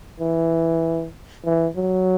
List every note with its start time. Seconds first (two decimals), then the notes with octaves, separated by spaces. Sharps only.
0.20 E3
1.45 E3
1.76 F#3